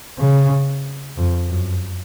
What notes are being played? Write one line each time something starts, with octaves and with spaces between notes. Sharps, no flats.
C#3
F2
F#2